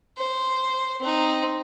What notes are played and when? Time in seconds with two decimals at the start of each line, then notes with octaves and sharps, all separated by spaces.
0.18 C5
1.01 C4 D#4